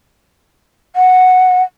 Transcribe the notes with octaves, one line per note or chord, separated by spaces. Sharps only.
F#5